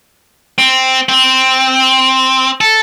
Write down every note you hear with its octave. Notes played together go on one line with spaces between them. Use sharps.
C4
C4
A4